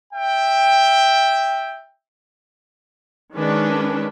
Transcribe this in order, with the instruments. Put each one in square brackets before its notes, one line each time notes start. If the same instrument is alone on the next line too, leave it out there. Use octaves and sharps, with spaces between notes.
[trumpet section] E5 G5
[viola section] D#3 G#3 C#4 D4 B4